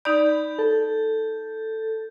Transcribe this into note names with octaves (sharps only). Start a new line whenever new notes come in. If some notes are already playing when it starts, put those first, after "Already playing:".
D#4 D5 B5 G6
A4